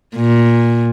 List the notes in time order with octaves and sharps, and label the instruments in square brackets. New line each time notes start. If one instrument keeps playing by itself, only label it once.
[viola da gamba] A#2